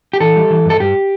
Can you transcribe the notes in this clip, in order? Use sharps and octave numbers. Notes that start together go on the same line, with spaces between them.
G4
E3 A4
G3
E3
G2 A4
G2 G4